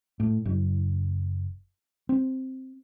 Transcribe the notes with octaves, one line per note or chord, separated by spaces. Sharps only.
A2
F#1
C4